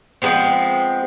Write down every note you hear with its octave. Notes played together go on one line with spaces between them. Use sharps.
F3 G#3 B3 C4